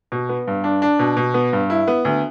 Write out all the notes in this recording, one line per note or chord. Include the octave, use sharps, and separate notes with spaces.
B2
B3
G2
D4
D4
B2
B2
B3
G2
E4
B3
D2